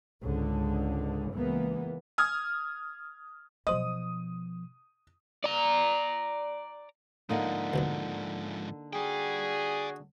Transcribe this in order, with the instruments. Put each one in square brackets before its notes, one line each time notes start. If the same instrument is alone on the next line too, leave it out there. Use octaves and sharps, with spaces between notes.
[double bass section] C#2 G#2 D3
C#2 E3 A#3 B3
[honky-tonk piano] D#6 F6 G#6
[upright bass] B2 F3 [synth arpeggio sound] F#3 C5 D#5 [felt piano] D#6
[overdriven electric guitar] D5 A#5
[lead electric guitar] G#2 F3 [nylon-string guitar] D3 A#3 D#4
[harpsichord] D2 B2 F#3
[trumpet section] F#4 G#4 [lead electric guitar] D5 G5